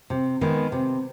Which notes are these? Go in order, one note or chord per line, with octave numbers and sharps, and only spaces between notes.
C3
D#3 G#3 B3
C3